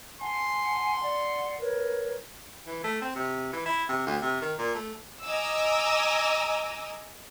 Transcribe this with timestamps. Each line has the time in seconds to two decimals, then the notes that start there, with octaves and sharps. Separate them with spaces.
0.21 F#5 G#5 A5 C6
1.03 D5 F#5
1.59 A#4 B4 C#5
2.67 E3
2.84 A3
3.02 C4
3.15 C3
3.53 E3
3.66 E4
3.89 C3
4.06 D2
4.22 C3
4.42 D#3
4.58 A#2
4.75 A3
5.24 D#5 G#5 A#5 D6 E6